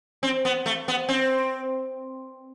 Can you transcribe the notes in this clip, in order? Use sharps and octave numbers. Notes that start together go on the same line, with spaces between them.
C4
B3
A3
B3
C4